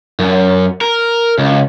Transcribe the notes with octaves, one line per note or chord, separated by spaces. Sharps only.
F#2
A#4
C#2